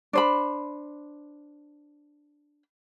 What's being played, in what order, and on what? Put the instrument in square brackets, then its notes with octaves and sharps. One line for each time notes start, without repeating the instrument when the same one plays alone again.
[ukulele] D4 C5 B5